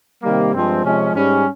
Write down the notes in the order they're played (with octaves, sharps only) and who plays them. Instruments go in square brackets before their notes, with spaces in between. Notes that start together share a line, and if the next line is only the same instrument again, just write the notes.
[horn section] C3 D#3 G3 A#3
G2 F3 G#3 C4
C3 F3 G#3 C#4
G#2 G3 C#4